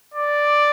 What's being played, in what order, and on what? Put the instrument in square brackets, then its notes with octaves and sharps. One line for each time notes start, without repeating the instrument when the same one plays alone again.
[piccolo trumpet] D5